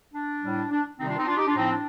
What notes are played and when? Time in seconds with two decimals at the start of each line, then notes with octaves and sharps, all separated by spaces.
0.14 D4
0.42 A2 G3
0.71 D4
0.98 C3 D#3 G3 C4 D#4
1.08 D4 F4
1.18 C4 D#4
1.27 D4 F4
1.37 D#4 G4
1.47 D4 F4
1.55 A2 F3 C4 D#4
1.70 D4